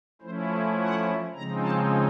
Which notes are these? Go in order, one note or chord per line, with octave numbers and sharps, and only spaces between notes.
F3 A3 C#4 E4 C5
C5
F#5
C#3 F3 G#3 C4 D#4 A#5
A5